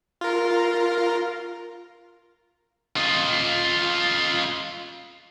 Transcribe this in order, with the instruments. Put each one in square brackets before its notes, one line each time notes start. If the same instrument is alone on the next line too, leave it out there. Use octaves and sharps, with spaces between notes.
[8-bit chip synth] F4 A#4
[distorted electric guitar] F4 D#5